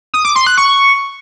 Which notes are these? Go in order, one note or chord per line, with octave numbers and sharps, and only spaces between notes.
D#6
D6
C6
F#6
C#6